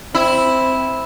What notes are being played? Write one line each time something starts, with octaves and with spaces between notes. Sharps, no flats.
C4 E4